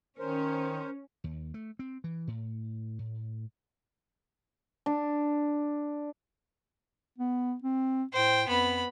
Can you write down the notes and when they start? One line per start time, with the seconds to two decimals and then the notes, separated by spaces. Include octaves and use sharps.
0.19 D#3 C#4 A#4 C5
1.24 D#2
1.54 A3
1.79 C4
2.04 E3
2.27 A2
2.99 A2
4.86 D4
7.18 B3
7.63 C4
8.13 A2 C5 G5
8.48 F2 B3 B5